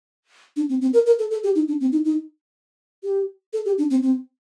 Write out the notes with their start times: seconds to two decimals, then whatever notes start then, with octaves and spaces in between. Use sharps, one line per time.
0.57 D4
0.69 C4
0.81 C4
0.93 A#4
1.06 A#4
1.19 A4
1.31 A4
1.43 G4
1.55 D#4
1.68 D4
1.81 C4
1.92 D#4
2.05 D#4
3.04 G4
3.53 A4
3.65 G4
3.78 D4
3.90 C4
4.03 C4